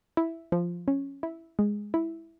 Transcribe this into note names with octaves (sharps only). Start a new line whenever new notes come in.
E4
F3
C#4
E4
G#3
E4